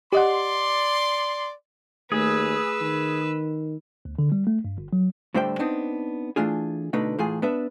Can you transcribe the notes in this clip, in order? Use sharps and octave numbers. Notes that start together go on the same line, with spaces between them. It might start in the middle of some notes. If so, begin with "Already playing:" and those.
G4 D5 D#5 F#5 C6
D#2 A3 G#4 B4 E6
D#3
D2
D3
G3
A3
G2
G1
F#3
A2 D3 G3 C5 E5 G5
B3 C4 D4 D#4
E3 A3 D4 F4 G#4
B2 D3 A3 D#4 B4
A2 E3 F4 G#4
B3 D4 B4 E5